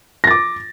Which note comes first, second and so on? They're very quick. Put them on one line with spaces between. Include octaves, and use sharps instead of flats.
A#6 A6 D6